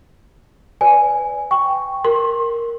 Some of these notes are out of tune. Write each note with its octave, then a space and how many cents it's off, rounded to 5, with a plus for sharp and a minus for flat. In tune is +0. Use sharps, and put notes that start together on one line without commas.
B4 +15 D5 -15 G#5 +0
G5 +0 C#6 +0
A#4 +0 C6 +30